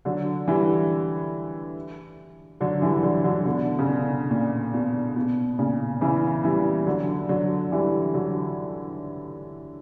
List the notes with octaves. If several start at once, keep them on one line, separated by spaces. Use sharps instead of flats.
D3 F#3
E3 G3
D3 F#3
E3 G3
D3 F#3
D3 F#3
B2 D3
C#3
B2
A#2
B2
B2
A#2 C#3
C#3 E3
E3 G3
D3 F#3
D3 F#3
E3 G3
D3 F#3